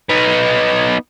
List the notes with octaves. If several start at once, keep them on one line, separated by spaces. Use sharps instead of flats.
B3 D#4